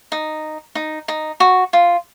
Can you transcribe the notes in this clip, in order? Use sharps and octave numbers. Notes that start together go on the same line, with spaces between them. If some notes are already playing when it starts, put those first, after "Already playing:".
D#4
D#4
D#4
F#4
F4